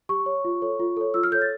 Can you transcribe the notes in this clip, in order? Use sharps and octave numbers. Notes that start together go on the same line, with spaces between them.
G4 C#6
C#5
F4
A4 C#5
F4
A4 C#5
F4 E6
F6
A4 C#5 G6
A6